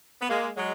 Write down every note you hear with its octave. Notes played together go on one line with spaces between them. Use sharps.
B3
G#3 A#3
F#3 G#3